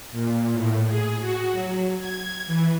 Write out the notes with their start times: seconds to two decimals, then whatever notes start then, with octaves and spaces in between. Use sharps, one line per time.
0.12 A#2
0.53 A2
0.87 G#4
1.20 F#4
1.52 F#3
2.00 G#6
2.47 E3